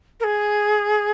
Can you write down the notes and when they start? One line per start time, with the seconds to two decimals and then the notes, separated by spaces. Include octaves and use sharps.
0.20 A#4
0.23 G#4